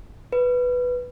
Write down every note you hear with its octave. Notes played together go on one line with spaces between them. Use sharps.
B4